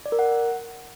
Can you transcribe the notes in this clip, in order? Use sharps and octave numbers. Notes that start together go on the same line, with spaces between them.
D5
A#4
F#5